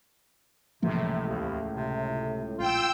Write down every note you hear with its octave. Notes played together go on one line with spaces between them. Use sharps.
C#2 A2 C3 E3 F3 A#3
D#2
C3
A#1 F4 G5 E6